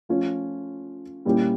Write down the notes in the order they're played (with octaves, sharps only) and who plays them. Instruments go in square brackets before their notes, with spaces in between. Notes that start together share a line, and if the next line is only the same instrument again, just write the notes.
[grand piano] F3 A3 C#4 F4
A#2 G3 C#4 E4 G4